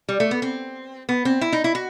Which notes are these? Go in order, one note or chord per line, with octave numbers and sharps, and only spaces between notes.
G3
A3
B3
C4
B3
C4
E4
D#4
E4
F#4